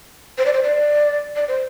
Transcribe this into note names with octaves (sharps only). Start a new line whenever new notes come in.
C5
D5
C5
D5
D5
C5